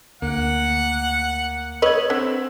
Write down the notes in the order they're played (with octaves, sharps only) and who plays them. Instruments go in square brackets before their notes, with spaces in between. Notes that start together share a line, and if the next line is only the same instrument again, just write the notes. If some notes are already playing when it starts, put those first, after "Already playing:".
[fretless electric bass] D2 [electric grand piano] A#3 [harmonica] F#5
[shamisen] B4 C#5 D#5 [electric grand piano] E6 G#6
[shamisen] D3 [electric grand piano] C4 E6 B6